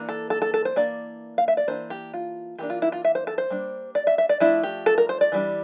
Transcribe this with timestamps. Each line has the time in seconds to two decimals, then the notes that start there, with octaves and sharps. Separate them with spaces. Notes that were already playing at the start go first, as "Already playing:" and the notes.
Already playing: E3 A#3 D4
0.09 A4
0.30 A4
0.42 A4
0.54 A4
0.65 C5
0.76 E3 A#3 D4 D5
1.38 F5
1.48 E5
1.57 D5
1.68 E3 A#3 D4 C5
1.90 G4
2.14 F4
2.59 E3 A#3 D4 G4
2.70 F4
2.82 E4
2.92 F4
3.05 E5
3.15 C5
3.27 A4
3.38 C5
3.50 G3 A#3 D4
3.95 D5
4.07 E5
4.18 E5
4.29 D5
4.40 F3 A3 D4 E4
4.63 G4
4.86 A4
4.98 A#4
5.09 C5
5.21 D5
5.32 E3 G3 D4